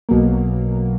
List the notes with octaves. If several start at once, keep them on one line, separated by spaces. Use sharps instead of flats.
B1 B2 F#3 A#3